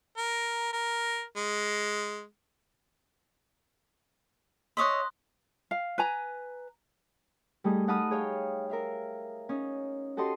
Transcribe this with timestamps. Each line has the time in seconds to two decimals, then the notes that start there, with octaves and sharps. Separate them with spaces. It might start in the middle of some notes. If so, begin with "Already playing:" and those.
0.18 A#4
0.73 A#4
1.36 G#3
4.77 C#5 D#5 E5 C6 D#6 F#6
5.71 F5
5.98 B4 G#5 A#5
7.64 G3 A3 D#4 G#4
7.88 D#4 F#5 A5 B5 D#6 F6
8.11 G#4 C#5 F5 G5
8.70 A#4 E5 F5
9.49 C#4 D#4
10.17 F#4 G4 A4 D#5 C6